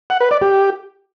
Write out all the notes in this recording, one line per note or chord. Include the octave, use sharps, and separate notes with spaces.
F#5
B4
D5
G4